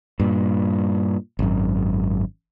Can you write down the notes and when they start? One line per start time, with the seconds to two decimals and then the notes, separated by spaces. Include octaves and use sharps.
0.20 G2 A#2
1.39 G#1 F#2